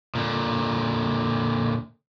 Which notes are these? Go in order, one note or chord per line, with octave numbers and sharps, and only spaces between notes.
A#2 D3